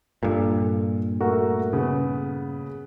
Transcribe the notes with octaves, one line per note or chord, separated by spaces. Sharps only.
G2 A#2 A4
A3 F#4 A#4
C#3 B3